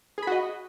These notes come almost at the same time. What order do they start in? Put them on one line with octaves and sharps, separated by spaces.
G#4 B5 F#4 D#5